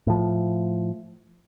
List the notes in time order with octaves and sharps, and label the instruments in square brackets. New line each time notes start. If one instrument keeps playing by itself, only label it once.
[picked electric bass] A2 F3